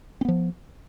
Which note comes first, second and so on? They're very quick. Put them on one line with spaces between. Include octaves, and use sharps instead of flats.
C4 B3 F3